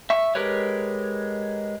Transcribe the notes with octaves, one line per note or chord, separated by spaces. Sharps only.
E5 C#6
G#3 G4 A#4 B4 C#5